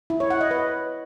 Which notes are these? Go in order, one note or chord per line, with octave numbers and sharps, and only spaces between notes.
E4
C#5
F#5
D#5
B4